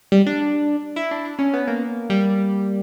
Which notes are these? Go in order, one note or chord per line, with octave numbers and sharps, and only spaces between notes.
G3
D4
E4
D4
D4
C#4
B3
A#3
G3